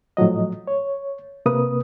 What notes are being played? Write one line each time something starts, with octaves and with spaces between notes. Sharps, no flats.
A2 F3 F#3 D#5
C#5
C3 A#3 B4 D#6